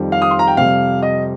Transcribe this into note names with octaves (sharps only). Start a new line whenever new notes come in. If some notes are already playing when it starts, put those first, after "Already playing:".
Already playing: F2 D#3 G3
F5
D#6
C6
A#5
G5
F2 C3 G3 F5
D#5